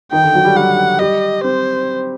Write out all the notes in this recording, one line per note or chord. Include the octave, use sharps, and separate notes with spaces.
D#3 D#4 G5
D3 D4
F#3 F#4
G3 G4
G3 G4 F#5
G3 G4 D#5
C4 C5